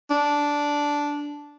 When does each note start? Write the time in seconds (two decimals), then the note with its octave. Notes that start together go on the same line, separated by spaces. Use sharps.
0.11 D4